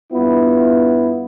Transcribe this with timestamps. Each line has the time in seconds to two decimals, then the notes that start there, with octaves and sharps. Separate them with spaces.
0.13 G2 B3 E4 F4